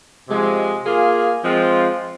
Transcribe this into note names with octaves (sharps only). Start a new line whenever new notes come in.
C3 F3 G#3
A#3 F4 G#4
F3 G#3 C4 F4